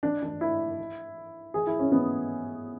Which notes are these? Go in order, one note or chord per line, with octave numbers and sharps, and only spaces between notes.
D4
D4
E4
G#4
E4
C#4
B3